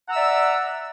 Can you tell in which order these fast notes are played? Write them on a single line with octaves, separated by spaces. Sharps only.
F#5 A#5 E6 E5 D5